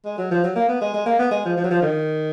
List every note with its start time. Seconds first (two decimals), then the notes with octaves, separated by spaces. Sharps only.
0.05 G#3
0.18 F#3
0.31 F3
0.44 F#3
0.56 A#3
0.69 B3
0.81 G#3
0.94 G#3
1.06 A#3
1.19 B3
1.31 G#3
1.45 F3
1.57 F3
1.64 F#3
1.71 F3
1.82 D#3